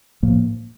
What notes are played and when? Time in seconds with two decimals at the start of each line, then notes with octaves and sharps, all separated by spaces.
0.23 A2 F3 A#3